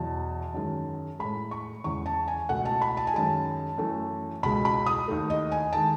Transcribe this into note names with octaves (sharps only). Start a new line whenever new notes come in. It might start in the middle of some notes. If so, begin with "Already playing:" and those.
Already playing: E2 B2 F#3 A5
F#2 D#3 G#3
A2 G#3 B5
C#6
E2 C#3 G#3 C#6
A5
G#5
C#2 B2 A3 F#5
A5
B5
A5
G#5
F#2 D#3 G#3 A5
F#2 E3 A3
C#2 B2 G#3 B5
B5
D#6
D#2 D#3 A3
D#5
G#5
D#3 G#3 A5